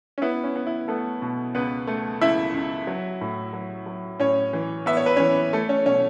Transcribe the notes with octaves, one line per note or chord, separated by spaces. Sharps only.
C#4
B3 E4
C#4
B3
E4
A3 B3 A4
B2
C#2 B3 B4
A3
C#2 E4 E5
C#2
F#3
A2
F#3
F#3
A2 C#4 C#5
E3
B3 E5
C#5
B4
E3 C#4 C#5
A3 A4
C#4 C#5
B2 C#4 C#5